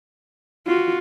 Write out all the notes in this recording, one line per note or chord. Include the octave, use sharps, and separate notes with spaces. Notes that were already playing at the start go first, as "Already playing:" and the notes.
F4 F#4